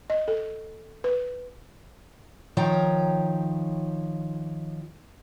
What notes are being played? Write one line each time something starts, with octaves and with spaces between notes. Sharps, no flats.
D#5
A4
B4
D#3 F3 C#5 G5 A#5